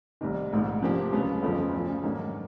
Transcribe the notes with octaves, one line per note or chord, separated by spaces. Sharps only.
C2 C3 D#3
A#1 G#2 D#3
C3 F3 A#3 D4 G4
C#2 C#3 F#3 B3
G1 F2 C#3 F3
D2 C#3 F3
G#2 D#3 F#3 A#3 D4